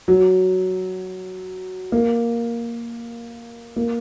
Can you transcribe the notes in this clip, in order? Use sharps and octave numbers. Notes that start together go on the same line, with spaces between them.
F#3
A#3
A#3